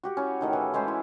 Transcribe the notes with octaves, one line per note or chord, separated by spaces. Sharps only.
F#4 G4 F#5
C#4 E4
A2 D#3 A4
E3
G#3 C#4 B4 C5
E4